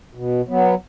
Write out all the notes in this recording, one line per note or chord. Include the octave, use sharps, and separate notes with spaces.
B2
F#3 B3